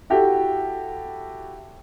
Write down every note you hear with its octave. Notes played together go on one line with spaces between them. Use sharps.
E4 F#4 G4 A4